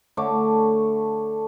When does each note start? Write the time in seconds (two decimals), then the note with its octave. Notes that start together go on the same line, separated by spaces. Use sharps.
0.17 D3 A3 C#5 D6